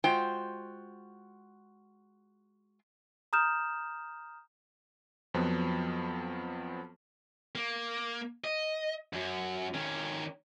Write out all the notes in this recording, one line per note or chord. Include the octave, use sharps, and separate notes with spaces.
G#3 F4 F#4 C5 G5
A#5 D#6 F6 G6 E7
F2 F3 F#3 B3
A#3
D#5
F#2 F#3
D#3 C#4